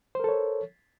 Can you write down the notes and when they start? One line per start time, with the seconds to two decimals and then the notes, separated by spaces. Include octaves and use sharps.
0.15 C5
0.20 A#4
0.24 A4
0.29 C#5